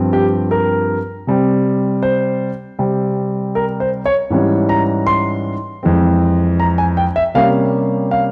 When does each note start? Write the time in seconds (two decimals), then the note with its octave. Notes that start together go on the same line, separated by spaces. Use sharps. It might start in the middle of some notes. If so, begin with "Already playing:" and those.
Already playing: G2 F3 C4
0.13 G4
0.51 A#4
1.27 C3 G3 C4
2.03 C5
2.79 C3 G3 C4
3.55 A#4
3.80 C5
4.06 C#5
4.30 G#2 E3 G3 C#4
4.69 A#5
5.07 C6
5.83 F2 E3 G#3 C4
6.60 A#5
6.78 G#5
6.97 G5
7.16 E5
7.34 C3 G3 A#3 C#4 F5
8.11 F5